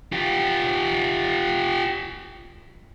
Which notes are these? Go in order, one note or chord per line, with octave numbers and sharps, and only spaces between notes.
F4 G4